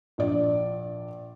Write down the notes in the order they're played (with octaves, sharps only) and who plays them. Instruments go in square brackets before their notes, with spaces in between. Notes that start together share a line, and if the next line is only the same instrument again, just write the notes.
[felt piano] A#1 D5